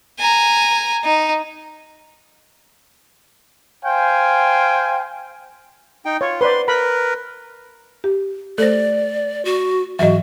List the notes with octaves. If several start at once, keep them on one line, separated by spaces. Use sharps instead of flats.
G#5 A#5
D#4
C5 F5 G5 G#5
D#4 G5
F4 C#5
B4 C5 D5 C6
A#4 B4 B5
G4
A3 A4 C5 D5 A#6
F#4
G#2 E3 F#3 F#4 D#5 E5